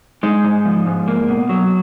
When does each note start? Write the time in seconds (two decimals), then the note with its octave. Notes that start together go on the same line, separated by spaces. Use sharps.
0.23 G#3 D#4
0.44 G#2
0.65 F3
0.86 G#2
1.08 A#3
1.29 B2
1.49 F#3